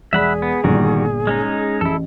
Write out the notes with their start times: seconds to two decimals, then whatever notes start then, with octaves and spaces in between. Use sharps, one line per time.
0.13 E1 G#4 D5 E5 F#5 B5 B6
0.42 B3
0.64 G1 A#2 D#3 G3 F#4
1.27 G#3 C#4 D#4
1.81 A1 E4 A4